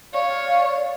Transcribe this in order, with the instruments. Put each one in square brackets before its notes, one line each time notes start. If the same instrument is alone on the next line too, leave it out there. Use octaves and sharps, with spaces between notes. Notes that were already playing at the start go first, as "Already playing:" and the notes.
[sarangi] C#5 [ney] D5 [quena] F5